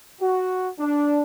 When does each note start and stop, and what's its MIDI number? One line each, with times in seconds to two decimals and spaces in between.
0.20 0.68 66
0.78 1.23 62